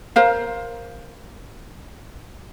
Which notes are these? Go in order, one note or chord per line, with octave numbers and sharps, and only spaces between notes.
A#4 C5 F5